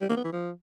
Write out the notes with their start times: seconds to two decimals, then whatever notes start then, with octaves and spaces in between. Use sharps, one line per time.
0.01 G3
0.09 A#3
0.17 B3
0.25 E3
0.32 F3